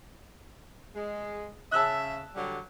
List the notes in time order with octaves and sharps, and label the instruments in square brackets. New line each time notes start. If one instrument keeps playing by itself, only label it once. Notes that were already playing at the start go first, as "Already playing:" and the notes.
[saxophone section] G#3
[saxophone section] C#3 E5 [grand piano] A5 E6 F#6
[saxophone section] D3 F#3 G3